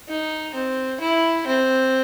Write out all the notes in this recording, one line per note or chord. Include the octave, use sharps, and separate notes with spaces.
D#4
C4
E4
C4